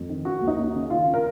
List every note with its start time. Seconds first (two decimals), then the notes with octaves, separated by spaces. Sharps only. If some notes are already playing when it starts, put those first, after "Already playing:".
Already playing: F2
0.09 D#3
0.25 C#3 F#4
0.42 D#2
0.47 D#4
0.59 D#2
0.74 C#3
0.90 D#3 F4
1.14 A#4